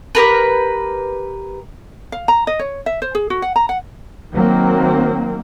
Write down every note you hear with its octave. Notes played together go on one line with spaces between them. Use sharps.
G4 A#4 B4
F5
A#5
D#5
C#5
E5
C5
G#4
F#4
F#5
A#5
F#5
D#3 F#3 A#3 C4